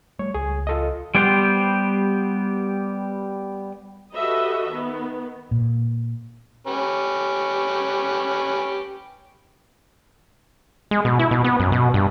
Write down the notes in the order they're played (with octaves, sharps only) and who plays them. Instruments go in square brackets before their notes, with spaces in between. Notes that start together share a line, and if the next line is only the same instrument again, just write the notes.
[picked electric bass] G3 A3 [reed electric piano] C#5
[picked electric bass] C#2 [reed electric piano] G#4
[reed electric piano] F4 A4 D#5
[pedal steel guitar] G3 B3 G4 C5
[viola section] F#4 G4 A4 B4 D#5 E5
D#3 B3
[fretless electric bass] A#2
[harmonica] C#4 G4 B4
[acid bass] G#3
B2
E4
B2
B3
F#2
B2
G2